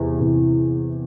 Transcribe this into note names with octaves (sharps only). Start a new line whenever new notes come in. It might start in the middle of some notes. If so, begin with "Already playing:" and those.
Already playing: E2 C3 E3
E2 C3 E3